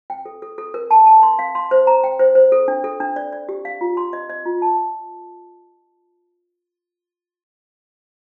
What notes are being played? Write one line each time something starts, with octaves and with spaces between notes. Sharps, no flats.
G5
A4
A4
A4
A#4
A5
A5
C6
F5
C6
C5
A#5
G5
C5
C5
A4
D4
A4
D4
D5
D5
G4
F5
F4
C6
D#5
D#5
F4
A5